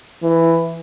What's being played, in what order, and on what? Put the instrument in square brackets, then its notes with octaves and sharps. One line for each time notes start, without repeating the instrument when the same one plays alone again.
[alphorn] E3